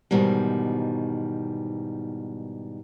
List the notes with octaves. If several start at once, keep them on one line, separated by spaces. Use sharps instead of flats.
G#2 B2 D#3 E3 G3